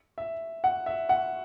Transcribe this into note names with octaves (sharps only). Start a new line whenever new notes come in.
E5
F#5
E5
F#5